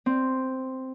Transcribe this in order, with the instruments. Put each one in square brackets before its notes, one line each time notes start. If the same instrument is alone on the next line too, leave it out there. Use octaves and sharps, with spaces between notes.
[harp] C4